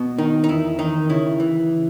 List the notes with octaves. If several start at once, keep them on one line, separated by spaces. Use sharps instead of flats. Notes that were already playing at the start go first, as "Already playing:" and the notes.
Already playing: B2
D#3 D#4
D#4
E2 E4
D#3 D#4
C#3 E4
E3